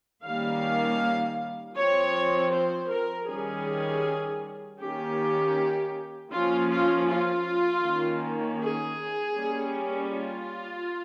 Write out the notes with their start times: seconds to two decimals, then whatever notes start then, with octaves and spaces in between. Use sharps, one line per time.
0.25 D#3 G3 A#3 C#4 F5
1.76 F3 C4 C#5
2.53 C5
2.90 A#4
3.28 D#3 G3 C#4 G#4
4.80 D#3 A#3 C#4 G4
6.32 F3 A#3 C#4 F4
6.69 F4
7.07 F4
7.83 D#3 A#3 C#4
8.59 G#4
9.34 G3 A#3 C#4
10.11 F4